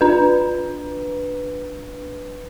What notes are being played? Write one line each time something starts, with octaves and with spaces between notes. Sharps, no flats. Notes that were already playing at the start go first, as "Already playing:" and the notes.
D4 B4